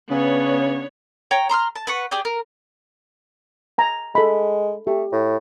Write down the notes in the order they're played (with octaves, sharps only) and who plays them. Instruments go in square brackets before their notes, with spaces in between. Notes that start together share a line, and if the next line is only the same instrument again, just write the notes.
[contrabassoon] C#3 [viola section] B3 D4 C#5
[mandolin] C#5 G5 A#5
A#5 C6 E6 F6
A5
B4 F#5 C#6
G4 G#4 D5 G5
A#4
[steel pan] G#5 A#5
[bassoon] G#3 [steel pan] A4 B5
[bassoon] A3 [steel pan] G4
[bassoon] A2